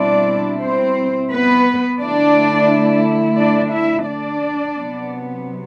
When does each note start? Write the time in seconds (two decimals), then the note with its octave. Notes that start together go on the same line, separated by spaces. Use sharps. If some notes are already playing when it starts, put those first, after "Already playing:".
Already playing: B2 G3 C4 D4 E4 D5
0.62 C4 C5
1.31 B3 B4
2.00 D3 A3 D4 E4 D5
3.37 D4 D5
3.72 E4 E5
4.07 D4 D5
4.76 C3 F#3 B3